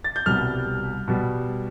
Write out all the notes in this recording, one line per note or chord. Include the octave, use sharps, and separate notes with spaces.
A6
G6
C2 B2 G3 F6
B2 G3